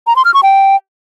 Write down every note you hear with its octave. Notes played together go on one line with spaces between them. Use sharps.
A#5
C6
F6
C#6
G5